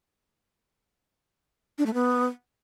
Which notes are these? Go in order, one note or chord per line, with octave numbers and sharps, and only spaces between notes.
D4
A3
B3